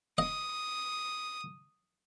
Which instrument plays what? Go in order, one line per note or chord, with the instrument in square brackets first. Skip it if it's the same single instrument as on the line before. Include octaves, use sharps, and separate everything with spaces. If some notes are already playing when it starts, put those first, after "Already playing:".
[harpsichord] D#5 [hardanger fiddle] D#6